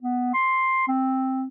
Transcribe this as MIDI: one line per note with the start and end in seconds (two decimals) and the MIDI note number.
0.02 0.32 59
0.34 0.84 84
0.88 1.45 60